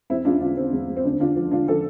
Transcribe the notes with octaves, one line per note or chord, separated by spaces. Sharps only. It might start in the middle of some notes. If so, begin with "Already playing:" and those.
E2 C4 E4
E2 D4 F4
D3 D4 F4
D3 C4
E2
E2
C4
D2 D4
D3 D4 F4
F3
D3 D4 F4
F3 F4 A4